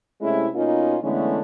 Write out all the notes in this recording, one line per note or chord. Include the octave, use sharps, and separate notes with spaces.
C3 G#3 A3 C#4 E4
B2 A#3 C#4 D#4 F4
D3 E3 G#3 A3 B3 C#4